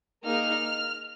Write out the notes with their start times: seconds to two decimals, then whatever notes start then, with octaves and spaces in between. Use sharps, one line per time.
0.25 A#3 D#4 G#4 F6